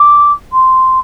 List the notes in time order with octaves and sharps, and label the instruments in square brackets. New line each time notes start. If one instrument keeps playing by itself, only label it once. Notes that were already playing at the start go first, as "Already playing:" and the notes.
Already playing: [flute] D6
C6